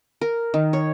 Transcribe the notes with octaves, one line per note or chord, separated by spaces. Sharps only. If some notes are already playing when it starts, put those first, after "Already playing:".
A#4
D#3
C#5